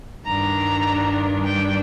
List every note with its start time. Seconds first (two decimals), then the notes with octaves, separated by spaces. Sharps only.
0.25 G2 D#3 G3 D4 A#5
1.45 G5